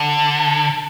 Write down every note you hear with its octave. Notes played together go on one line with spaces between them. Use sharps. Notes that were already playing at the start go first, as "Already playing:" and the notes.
Already playing: D3